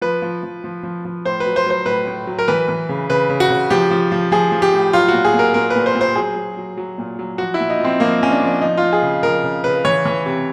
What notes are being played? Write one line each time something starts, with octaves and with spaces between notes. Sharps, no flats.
F3 B4
F3
F3
F3
F3
F3
A2 C5
B4
F#3
C5
F#3 C5
A2 B4
A2
F#3
A#4
E3 B4
E3
C#3
C#3 B4
C#3
F#4
C#3
F3 G4
F3
F3
F3 G#4
F3
G4
A2
F#3 F4
A#2 F#4
G#4
A#2
A#4
A#2 A#4
B4
A#2
C5
A#2
C5
F#3 G#4
F#3
F#3
F#3
A#2
F#3
F3 F#4
E4
A#2
D#4
F3 C4
F3 A#3
F3 C#4
D4
F3 D4
F3 D#4
F4
F3
G#4
C#3
F3 A#4
C#3
C#3 B4
E3 C#5
E3
C3